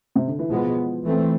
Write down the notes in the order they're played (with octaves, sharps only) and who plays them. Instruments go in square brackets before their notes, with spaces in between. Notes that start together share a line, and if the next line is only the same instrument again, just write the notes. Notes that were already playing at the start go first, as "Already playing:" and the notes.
[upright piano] C3
D3
E3
[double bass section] B2 G#3 B3 [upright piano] F3
[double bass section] E3 A3 C4